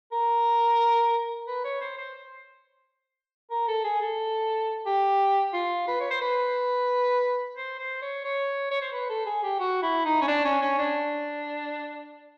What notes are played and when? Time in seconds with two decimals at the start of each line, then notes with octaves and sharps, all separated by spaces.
0.12 A#4
1.47 B4
1.64 C#5
1.81 C5
1.98 C5
3.51 A#4
3.68 A4
3.84 G#4
4.01 A4
4.86 G4
5.53 F4
5.88 B4
6.00 C#5
6.10 C5
6.21 B4
7.57 C5
7.79 C5
8.02 C#5
8.24 C#5
8.71 C#5
8.82 C5
8.92 B4
9.09 A4
9.26 G#4
9.43 G4
9.60 F#4
9.82 E4
10.05 D#4
10.22 C#4
10.28 D4
10.45 C#4
10.61 C#4
10.79 D4